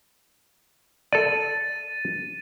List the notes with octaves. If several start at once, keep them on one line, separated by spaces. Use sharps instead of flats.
A4 D5 A6 D#7